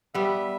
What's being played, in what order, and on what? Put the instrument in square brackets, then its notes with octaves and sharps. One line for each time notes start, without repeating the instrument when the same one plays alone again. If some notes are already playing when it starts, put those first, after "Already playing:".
[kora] G3 B3 [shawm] E5